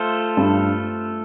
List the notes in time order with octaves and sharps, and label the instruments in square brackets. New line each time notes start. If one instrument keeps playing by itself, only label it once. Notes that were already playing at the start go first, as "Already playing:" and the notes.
Already playing: [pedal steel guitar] A3 F4 A4 C5
[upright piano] G2